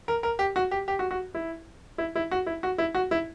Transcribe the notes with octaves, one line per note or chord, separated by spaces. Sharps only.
A#4
A#4
G4
F#4
G4
G4
F#4
F#4
E4
E4
E4
F#4
E4
F#4
E4
F#4
E4